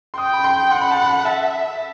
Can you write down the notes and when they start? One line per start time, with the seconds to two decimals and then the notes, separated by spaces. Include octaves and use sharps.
0.14 C6
0.18 G5 D#6
0.33 B5
0.44 C6
0.71 F#5 C6
0.81 B5
0.91 A5
1.00 B5
1.25 E5 A5